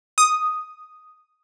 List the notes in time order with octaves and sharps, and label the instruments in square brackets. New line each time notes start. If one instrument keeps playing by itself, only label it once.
[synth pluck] D#6